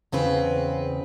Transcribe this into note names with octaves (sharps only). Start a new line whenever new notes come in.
E2 C#3 C4 B4